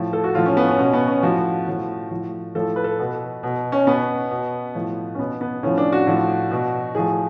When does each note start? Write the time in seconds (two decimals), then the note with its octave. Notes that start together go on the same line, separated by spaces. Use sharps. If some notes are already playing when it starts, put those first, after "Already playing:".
Already playing: A2 F3
0.13 A4
0.24 F#4
0.35 A2 F3 F4
0.46 C#4
0.57 B3
0.68 C#4
0.79 B2 C#4
0.93 B3
1.08 C#4
1.23 A2 F3 F#4
1.67 A2 F3
2.11 A2 F3
2.55 A2 F3 A4
2.76 B4
2.84 A4
2.99 B2
3.43 B2
3.72 C#4
3.87 B2 B3
4.31 B2
4.75 A2 F3
5.15 C#4
5.19 B2 B3
5.41 B3
5.63 A2 F3 C#4
5.78 D4
5.92 F#4
6.07 A2 F3
6.51 B2
6.95 A2 F3 G#4